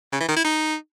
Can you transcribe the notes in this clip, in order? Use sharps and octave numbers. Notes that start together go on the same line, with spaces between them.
C#3
E3
D#3
E4
D#4